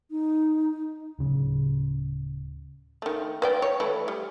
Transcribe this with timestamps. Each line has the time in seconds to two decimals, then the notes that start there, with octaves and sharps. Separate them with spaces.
0.11 D#4
1.19 D1 C#3
3.02 D#3 A3
3.42 B4 D5 G5
3.62 C#5
3.80 E3 A3 E4
4.08 G3